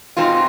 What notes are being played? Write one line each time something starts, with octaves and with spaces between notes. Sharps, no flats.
B2 G#3 C4 D#4 F4